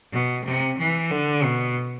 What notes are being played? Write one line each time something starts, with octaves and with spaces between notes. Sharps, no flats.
B2
C3
E3
D3
B2